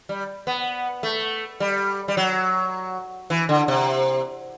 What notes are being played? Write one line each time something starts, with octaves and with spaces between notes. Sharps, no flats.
G3
B3
A3
G3
G3
F#3
E3
D3
C3